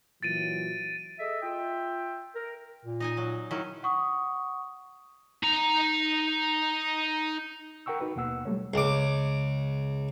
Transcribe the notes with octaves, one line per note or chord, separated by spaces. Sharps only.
A#2 E3 F#3 A6 D7 D#7
G#4 A4 D#5 E5
F4 E5 G5
A#4
A#2
D#4 D#5 G#5
F#3
D#3 F#3 C#4 E4
F#5 C#6 D#6
D#4 A#5
A#4 F#5 G5 C#6 E6
D#4 F#4 B4
D#2 B2 A#3 F#5 E6
F#3 G3 A3 A#3 C#5
C#2 D6